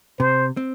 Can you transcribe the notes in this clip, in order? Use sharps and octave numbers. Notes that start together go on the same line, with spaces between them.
C3 C5
C4